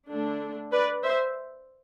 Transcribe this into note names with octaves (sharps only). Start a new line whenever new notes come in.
D3 A3 D4
B4 D5
C5 E5